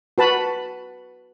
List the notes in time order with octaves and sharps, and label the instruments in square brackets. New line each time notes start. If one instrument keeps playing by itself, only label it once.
[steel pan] F#4 B4 A5 B5